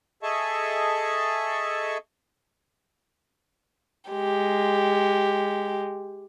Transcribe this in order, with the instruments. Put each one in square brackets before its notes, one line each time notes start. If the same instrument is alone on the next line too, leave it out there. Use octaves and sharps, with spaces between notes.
[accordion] G#4 A4 D#5 E5 A5 C#6
[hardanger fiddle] G#3 G4